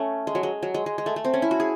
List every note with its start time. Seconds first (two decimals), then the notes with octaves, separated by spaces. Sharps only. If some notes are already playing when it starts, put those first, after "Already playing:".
Already playing: A3 C#4
0.27 G#3
0.35 F#3
0.43 G#3
0.63 F#3
0.74 G#3
0.86 G#3
0.98 G#3
1.06 A3
1.16 A3
1.25 C4
1.34 C#4
1.42 E4
1.51 F#4
1.60 G#4